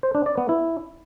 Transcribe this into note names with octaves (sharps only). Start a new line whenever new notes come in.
C5
D4
D5
B3
E4